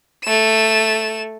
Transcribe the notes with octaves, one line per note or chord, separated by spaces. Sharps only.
A3 E7